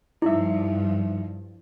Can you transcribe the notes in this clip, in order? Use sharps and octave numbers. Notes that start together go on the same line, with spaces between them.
G2 F3 D#4 E4 E5